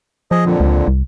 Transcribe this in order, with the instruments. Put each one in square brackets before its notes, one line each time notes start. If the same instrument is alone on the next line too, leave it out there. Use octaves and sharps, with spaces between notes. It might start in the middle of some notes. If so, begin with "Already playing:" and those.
[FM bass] F3 [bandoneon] G#4 D#5
[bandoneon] F2 A#2 D3
[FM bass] C#2
C2